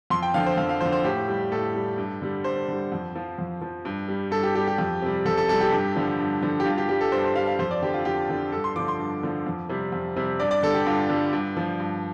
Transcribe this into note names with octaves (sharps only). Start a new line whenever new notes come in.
F2 C6
G5
D3 F3 F5
C5
F2 F5
F5
D3 F3 C5
C5
A2 G4
G3
A2 A4
G3
G2
D3 G3
G2 C5
D3 G3
F2
F3
F2
F3
G2
G3
G2 A4
G4
G3 G4
G4
F2
C3 G3
F2 A4
A4
C3 G3 A4
G4
G2
D3 F3
G2
D3 F3
G4
G2 F4
G4
G3 G4
A4
G2 C5
C5
G3 F5
F5
F2 C5
D5
D3 F3 G4
F4
F2 G4
D3 F3
G2 A4
C6
D3 F3 D6
C6
G2
D3 F3
F2
C3 G3
F2
C3 G3
G2 D5
D5
D3 G3 A4
G4
G2 F4
D3 G3
G2
F3
G2